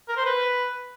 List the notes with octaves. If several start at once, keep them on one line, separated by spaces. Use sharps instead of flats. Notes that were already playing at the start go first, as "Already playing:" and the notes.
A#4
C5
B4